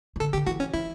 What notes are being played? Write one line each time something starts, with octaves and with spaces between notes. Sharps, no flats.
E3
D3 A4
D3 G4
E3 F#4
C#4
E3 E4